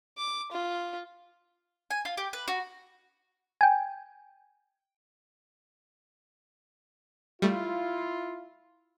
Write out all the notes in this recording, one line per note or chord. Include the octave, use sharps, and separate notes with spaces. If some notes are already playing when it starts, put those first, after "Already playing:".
D6
F4
G#5
F4
G4
B4
F#4
G5 G#5
G3 A3 E4 F4